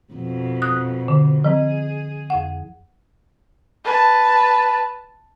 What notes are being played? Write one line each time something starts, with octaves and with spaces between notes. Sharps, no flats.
F2 B2
D#6 F#6
D3
F3 C4 G#4
F2 F#5
B4 A5